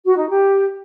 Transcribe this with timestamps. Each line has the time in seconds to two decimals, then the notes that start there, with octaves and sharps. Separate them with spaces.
0.06 F#4
0.17 D#4
0.29 G4